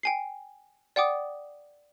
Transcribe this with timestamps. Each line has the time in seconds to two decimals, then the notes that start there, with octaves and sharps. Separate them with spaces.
0.03 G5 G#5 C7
0.96 D5 F#5 G5 D6 D#6